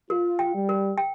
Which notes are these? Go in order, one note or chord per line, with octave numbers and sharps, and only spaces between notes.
F4 A#4
G5
G3
A#4
G5